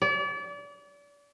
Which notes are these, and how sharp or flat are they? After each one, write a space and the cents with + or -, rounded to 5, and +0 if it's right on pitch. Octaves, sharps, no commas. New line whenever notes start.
D5 -35